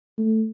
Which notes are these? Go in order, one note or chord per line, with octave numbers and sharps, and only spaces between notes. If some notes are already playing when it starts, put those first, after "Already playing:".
A3